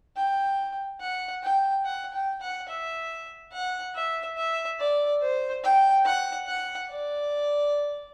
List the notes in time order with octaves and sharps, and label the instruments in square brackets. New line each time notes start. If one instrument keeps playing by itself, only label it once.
[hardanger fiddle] G5
F#5
G5
F#5
G5
F#5
E5
F#5
E5
E5
D5
C5
G5
F#5
F#5
D5